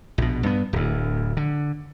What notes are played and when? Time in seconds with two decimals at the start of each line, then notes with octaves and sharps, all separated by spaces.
0.18 A#1 B2
0.43 G2 B3
0.73 D1 D2
1.37 D3